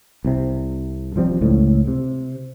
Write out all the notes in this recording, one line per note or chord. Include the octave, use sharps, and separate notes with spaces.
C2 C3
D#1 F3 G3 C4
C#2 A2
C3